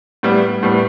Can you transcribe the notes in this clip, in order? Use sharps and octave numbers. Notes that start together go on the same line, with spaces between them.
A2 G3 B3
A2 G3 B3